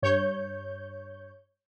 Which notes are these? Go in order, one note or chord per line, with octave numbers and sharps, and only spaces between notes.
G2 C#5 G6